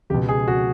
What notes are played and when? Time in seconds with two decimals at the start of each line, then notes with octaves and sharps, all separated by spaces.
0.10 C#2 G4
0.14 B2
0.29 G#4
0.48 F#4